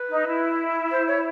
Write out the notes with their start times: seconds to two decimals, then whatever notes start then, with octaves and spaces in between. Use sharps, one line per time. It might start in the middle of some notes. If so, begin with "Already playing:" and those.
Already playing: B4
0.10 D#4
0.26 E4
0.91 C5
1.08 C#5